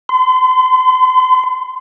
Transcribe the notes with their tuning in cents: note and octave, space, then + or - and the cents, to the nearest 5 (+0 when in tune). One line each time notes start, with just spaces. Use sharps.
C6 -40